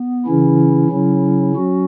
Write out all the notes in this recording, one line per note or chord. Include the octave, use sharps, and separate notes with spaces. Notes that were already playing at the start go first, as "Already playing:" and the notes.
Already playing: B3
C#3 E3 C#4 E4
C#3 F#3 C#4 E4
F#3 C#4 F#4